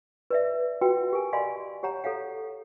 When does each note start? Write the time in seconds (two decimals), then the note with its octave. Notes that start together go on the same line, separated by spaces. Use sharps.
0.31 B4 D5 E5
0.81 F4 F#4 B4 F#5 G5
1.13 G4 A#4 G#5
1.33 D5 D#5 F5 G#5 B5 C6
1.83 G4 C#5 F#5 A#5
2.04 A4 C#5 F5 F#5